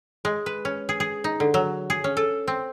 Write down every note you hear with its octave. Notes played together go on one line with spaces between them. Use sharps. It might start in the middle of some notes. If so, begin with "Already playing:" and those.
G#3
B4
C#4
G#4
G#4
D#4
D3
F#3
G#4
C#4
A4
C4